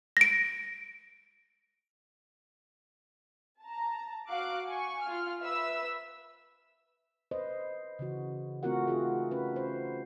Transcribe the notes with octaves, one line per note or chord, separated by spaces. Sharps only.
A#6 D7
A5 A#5
F#4 F5 D6 F#6 D7
G#5 C#6
F4 F6
B4 E5 E6
B4 C5 D#5
C#3 E3 F#4
A3 C4 F4 F#4 A#4 F#5
D#4 F4 G#4
C#4 B4
C5